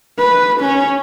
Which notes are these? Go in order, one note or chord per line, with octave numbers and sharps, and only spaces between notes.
B4
C#4